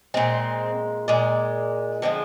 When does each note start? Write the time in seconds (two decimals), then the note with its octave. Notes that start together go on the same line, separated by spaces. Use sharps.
0.14 A#2 G#3 C4
1.08 A#2 G#3
2.02 D3 F3 G#3 C4